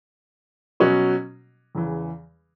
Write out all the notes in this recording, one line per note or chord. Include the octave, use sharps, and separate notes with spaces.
B2 F#3 C#4 F#4
E2 C#3 E3